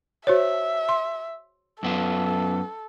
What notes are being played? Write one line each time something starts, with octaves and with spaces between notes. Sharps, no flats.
F#4 C5 C#5 E5
C6
F#2 B3 F4 A4